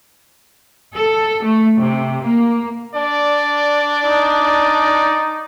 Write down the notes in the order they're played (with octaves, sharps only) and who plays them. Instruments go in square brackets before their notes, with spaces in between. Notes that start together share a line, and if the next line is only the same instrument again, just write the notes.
[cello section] A4
A3
C3
A#3
[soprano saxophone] D4 [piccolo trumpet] D5
[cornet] D#4